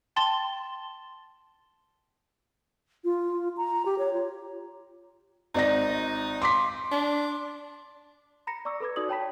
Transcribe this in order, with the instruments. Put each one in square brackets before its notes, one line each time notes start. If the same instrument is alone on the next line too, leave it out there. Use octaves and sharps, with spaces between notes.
[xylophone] G5 A5 C6 A6 G7
[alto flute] F4
A#5
G4
C#5
F4
[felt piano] G#1 D5 A#6 [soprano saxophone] D#4
[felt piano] C6 D6 B6
[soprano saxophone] D4
[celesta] A#5 B5 A#6 C#7
D5 A#5 C#6 D6 E6
A4 B4 B5 D6 G#6
D#4 F#4 D5 D#6 F#7
C#5 G5 A5 B5 B6